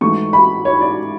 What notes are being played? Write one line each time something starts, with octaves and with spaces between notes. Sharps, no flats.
G#2 E3 A3 C#6
B5
C#5
D5